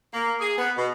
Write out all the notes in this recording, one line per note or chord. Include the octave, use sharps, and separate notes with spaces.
A#3
G#4
B3
B2